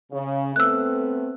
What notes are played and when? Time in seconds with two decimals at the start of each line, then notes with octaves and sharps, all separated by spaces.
0.11 C#3
0.56 A3 B3 C4 E6 F#6